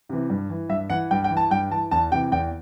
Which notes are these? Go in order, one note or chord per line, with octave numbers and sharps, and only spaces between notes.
C3 E3
G2
E3
G2 E5
E3 F#5
G2 G5
G5
E3
A5
G2 G5
E3 A5
E2 A5
C3 E3 G5
E2 G5